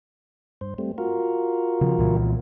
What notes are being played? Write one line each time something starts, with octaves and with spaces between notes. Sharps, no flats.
G2 C5
G3 A3 C4
F4 F#4 A#4
C#3 F3
C2 A#2 E3